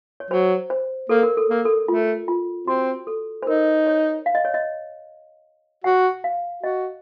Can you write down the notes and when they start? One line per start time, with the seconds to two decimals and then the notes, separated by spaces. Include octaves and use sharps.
0.20 C#5
0.31 F#3 C5
0.70 C5
1.09 A#3 A4
1.23 A#4
1.37 A4
1.50 A#3 A#4
1.65 A4
1.88 A3 F4
2.28 F4
2.67 C4 F#4
3.07 A4
3.42 C5
3.47 D#4 A#4
3.87 C#5
4.26 F5
4.35 D#5
4.45 C#5
4.54 D#5
5.84 F#4 F#5
6.24 F5
6.63 F#4 D#5